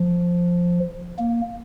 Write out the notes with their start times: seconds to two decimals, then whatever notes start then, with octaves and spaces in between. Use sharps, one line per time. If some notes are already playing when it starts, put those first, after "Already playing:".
Already playing: F3
1.19 A#3